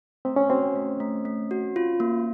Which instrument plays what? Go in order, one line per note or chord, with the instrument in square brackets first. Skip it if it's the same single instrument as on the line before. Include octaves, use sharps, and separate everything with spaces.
[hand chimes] A3 [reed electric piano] C4
[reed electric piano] C#4
[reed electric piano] C4 [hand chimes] F#4
[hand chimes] A3
A3
A3
F#4
F4
A#3